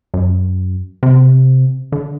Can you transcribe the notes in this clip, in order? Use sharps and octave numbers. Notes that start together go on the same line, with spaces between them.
F#2
C3
D3